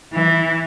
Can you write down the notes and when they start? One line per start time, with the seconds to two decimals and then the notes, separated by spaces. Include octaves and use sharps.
0.14 E3